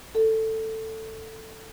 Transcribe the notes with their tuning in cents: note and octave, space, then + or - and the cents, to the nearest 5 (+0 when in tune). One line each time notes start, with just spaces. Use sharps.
A4 +10